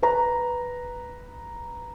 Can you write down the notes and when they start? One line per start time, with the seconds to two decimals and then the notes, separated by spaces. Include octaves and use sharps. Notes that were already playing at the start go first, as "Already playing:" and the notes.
0.02 B4 A#5